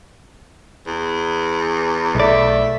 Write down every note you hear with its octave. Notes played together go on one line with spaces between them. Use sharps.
E2
B1 A3 D5 E5